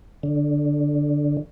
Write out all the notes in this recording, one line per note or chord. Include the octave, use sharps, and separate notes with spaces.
D3